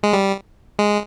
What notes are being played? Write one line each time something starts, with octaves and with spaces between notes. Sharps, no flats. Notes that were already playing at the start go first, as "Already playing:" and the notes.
G#3
G3
G#3